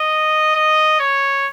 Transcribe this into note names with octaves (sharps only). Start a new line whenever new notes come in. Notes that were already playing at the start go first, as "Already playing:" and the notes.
Already playing: D#5
D#5
C#5